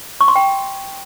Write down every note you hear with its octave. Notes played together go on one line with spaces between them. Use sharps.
C#6
C6
G5